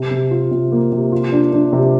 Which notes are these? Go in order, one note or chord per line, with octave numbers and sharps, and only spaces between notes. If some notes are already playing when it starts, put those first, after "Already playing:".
Already playing: C3
C3
F4
C3
A#3
C3
F4
D4
D4
C3